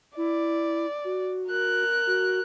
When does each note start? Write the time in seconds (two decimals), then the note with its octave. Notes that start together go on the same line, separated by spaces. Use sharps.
0.17 E4 D5
1.05 F#4
1.48 A#4 F#6
2.07 F#4